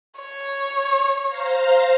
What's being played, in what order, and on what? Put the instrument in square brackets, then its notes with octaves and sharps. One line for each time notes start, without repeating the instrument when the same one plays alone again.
[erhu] C#5
[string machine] C5 F5 A#5